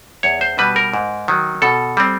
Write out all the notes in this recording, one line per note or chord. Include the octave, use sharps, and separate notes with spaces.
E2 C#5
C5
B2 G3 B4
A#4
G#2
D#3 F#3
B2 A4
G3 C4